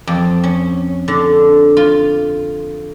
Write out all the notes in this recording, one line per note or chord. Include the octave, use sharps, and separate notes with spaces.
F2
C#4
D3
F4